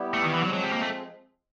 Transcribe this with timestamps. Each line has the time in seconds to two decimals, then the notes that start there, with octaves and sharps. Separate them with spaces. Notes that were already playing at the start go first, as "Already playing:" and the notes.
Already playing: G3 B3 E4 G4
0.14 A3
0.23 D#3
0.34 E3
0.43 F3 F#3 G#3 C4
0.53 F#3
0.64 G3
0.73 A#3
0.82 A3